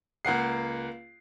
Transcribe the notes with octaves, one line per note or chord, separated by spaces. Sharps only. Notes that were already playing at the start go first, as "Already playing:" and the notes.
C#2 A#3 F#5 C7